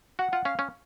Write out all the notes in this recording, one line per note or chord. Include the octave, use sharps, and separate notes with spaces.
F#4 F#5
F4 F#5
C#4 F5
C#4